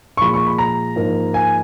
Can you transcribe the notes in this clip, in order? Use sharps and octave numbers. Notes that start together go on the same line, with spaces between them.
C#6
A#2 F3 G#3 B5
C#6
B5
A#5
G#2 F3 A#3
G#5